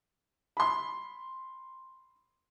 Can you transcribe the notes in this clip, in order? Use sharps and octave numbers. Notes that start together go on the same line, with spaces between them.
B5 C6